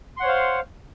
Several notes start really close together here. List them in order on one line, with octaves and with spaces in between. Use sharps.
C6 F#5 C#5 C5 F5